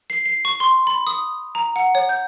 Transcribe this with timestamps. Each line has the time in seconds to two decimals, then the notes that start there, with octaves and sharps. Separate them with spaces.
0.10 C7
0.26 C7
0.45 C#6
0.60 C6
0.87 B5
1.07 D#6
1.55 A#5
1.76 F#5
1.95 C#5
2.09 G6